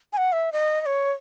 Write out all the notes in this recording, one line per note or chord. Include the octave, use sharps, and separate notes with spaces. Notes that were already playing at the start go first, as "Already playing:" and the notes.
G#5
F#5
E5
D#5
D#5
C#5